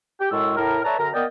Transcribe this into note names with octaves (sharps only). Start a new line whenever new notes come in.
G4 G5
F#2 A2 G#3 A4 C#6 E6
A2 A#4
A4 B4 C#5 D5 E5 A#5
F#2 D3 A#4 A#5
A#3 B3 A#4 D5 D#5 G5